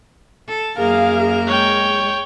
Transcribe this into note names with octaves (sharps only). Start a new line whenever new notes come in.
A4
F#2 A#3 G#4 A#4 F5
G#3 C#5 G5